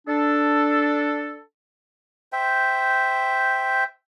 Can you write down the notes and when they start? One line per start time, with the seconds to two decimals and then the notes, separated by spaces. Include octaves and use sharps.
0.08 D4 A4
2.32 C5 E5 G5